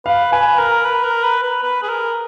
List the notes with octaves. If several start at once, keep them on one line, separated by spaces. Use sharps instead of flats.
B4 F5
B4 G#5
A#4 A#5
B4
A#4
B4
B4
B4
G#4
A#4